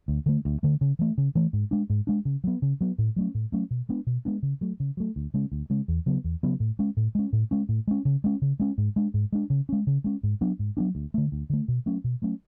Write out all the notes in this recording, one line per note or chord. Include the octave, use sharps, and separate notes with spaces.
D2
D3 A3
D2
D3 A3
C#3
E3 A3
C#3
E3 A3
G#2
G#3 D4
G#2
G#3 D4
C#3
F#3 B3
C#3
F#3 B3
A2
F#3 A3 C#4
A2
F#3 A3 C#4
B2
G#3 B3 D4
B2
G#3 B3 D4
C#3
F#3 A3
C#3
F#3 A3
D2
C#3 G#3 C#4
D2
C#3 G#3 C#4
E2
C#3 F#3 B3
E2
C#3 F#3 B3
A2
G#3 C#4
A2
G#3 C#4
A2
G#3 C#4
A2
G#3 C#4
C#3
G#3 C#4
C#3
G#3 C#4
G#2
G#3 D4
G#2
G#3 D4
C#3
G#3 C#4
C#3
G#3 C#4
G#2
F#3 B3 D4
G#2
F#3 B3 D4
D2
D3 A3
D2
D3 A3
B2
F#3 A3 C#4
B2
F#3 A3 C#4